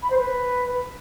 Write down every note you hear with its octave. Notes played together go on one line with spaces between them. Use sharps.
B5
C5
B4